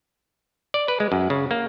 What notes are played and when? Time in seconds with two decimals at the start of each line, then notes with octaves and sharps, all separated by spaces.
0.74 D5
0.88 B4
1.00 G#3
1.12 F#2
1.30 C#3
1.51 A#3